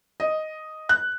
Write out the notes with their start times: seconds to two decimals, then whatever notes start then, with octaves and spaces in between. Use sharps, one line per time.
0.20 D#5
0.89 F#6